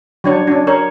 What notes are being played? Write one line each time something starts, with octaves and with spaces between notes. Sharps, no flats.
F#3 D4 C#5
C#4 D4
A#4 C#5